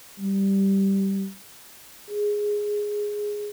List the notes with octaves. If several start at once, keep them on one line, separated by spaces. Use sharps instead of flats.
G3
G#4